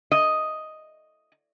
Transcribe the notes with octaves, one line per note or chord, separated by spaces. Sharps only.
D#5